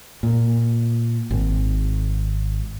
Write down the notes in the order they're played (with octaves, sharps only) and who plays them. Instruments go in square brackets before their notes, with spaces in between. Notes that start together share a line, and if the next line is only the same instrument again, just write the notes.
[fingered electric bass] A#2
G#1